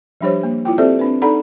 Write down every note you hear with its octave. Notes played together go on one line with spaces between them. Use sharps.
F3 G3 D4 G4 C5 C#5
A#3
E4 F4 G5
C4 G4 A4 C5 D5 E5
C4 D4 B4
D#4 A4 D5 F#5 A#5 B5